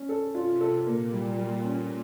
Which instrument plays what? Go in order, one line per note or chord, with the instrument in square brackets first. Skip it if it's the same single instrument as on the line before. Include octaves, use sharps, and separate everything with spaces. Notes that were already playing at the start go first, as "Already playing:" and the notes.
Already playing: [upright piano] C#4
A4
[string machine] C3 [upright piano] F4
[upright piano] A4
[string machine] A#2 [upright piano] A#3
[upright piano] G3
G3
C#4